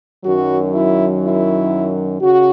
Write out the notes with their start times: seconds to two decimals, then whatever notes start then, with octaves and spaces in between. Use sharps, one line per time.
0.23 F#2 D#3 F#3 F#4
0.73 E4
1.23 E4
2.22 C#3 F#4